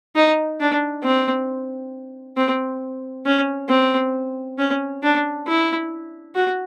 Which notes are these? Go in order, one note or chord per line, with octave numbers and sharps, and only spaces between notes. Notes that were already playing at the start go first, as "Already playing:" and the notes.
D#4
D4
C4
C4
C#4
C4
C#4
D4
E4
F#4